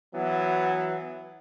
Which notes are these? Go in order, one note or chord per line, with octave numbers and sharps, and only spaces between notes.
E3 F#3 B3